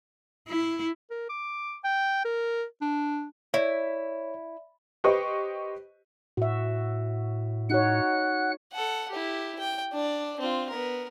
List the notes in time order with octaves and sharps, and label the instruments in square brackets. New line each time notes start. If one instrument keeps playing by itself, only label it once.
[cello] E4
[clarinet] A#4
D6
G5
A#4
D4
[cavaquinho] E4 [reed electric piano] C#5 [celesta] D5 E5
[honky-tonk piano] G4 B4 C5 D#5 C#6
[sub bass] A2 [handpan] F#4 E5
[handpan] D#4 F#4 C#5 [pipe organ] F#5 F#6
[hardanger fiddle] A4 F#5
E4 G4
G5
D4 D5
C4 F4
B3 A#4